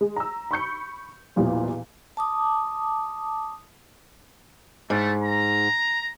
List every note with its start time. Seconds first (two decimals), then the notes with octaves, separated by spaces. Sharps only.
0.01 G#3
0.16 A#5 E6
0.51 B5 C#6 G6 C#7
1.36 B1 E2 A#2 F3 G3
2.17 A5 D6 D#6
4.90 G#2 A3
5.21 A#5